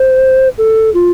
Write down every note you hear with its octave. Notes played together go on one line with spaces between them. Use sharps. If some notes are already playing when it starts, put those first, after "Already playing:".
Already playing: C5
A4
F4